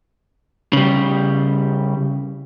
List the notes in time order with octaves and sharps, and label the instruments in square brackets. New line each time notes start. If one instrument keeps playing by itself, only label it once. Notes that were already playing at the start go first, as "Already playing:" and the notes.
[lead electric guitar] C#3 G3